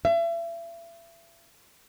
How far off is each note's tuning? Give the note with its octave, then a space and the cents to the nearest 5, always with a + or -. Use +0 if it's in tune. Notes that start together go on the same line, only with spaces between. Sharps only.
E5 +35